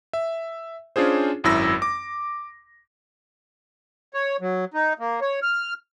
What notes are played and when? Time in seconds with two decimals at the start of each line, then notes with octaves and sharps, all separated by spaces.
0.13 E5
0.96 C#4 D4 F4 G#4 C5
1.44 G#1 F#2 E4 E6 A#6
1.82 D6
4.14 C#5
4.41 F#3
4.74 D#4
4.99 A#3
5.21 C#5
5.43 F6